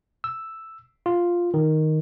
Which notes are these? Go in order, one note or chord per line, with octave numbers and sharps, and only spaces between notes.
E6
F4
D#3